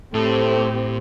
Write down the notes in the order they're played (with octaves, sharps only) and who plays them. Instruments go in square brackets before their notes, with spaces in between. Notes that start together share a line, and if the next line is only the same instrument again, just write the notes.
[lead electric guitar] A2 [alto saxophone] A3 [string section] C4 G4